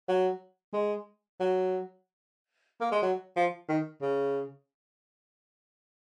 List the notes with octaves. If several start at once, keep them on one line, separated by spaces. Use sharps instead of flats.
F#3
G#3
F#3
A#3
G#3
F#3
F3
D#3
C#3